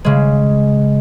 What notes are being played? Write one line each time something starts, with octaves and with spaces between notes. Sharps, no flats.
C#3 G#3